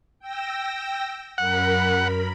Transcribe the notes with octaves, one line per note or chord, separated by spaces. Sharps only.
G5 E6 A#6
F#2 A#4 F#5 B5